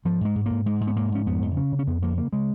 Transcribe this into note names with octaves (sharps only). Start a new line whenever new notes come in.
G#2 F3
G#2 G#3
G#2
G#2 A#3
G#2 G#3
G#2
B3
G#2 A#3
G#2 C#4
F2 B3
F2
C#3 C#4
C#3
C#4
F2 B3
F2 A#3
C#3 A#3
C#3 G#3